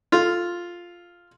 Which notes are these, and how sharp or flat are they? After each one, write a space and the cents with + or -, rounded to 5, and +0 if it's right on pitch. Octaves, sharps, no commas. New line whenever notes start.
F4 +0 A4 +0